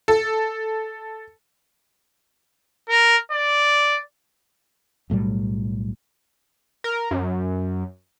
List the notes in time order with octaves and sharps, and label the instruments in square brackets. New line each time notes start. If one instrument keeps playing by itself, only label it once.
[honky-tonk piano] A4
[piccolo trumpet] A#4
D5
[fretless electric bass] B1 A2 F#3 G3
[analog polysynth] A#4
F#2